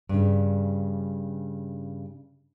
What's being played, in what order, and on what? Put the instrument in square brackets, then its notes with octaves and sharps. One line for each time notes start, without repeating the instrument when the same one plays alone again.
[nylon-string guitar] G2 C#3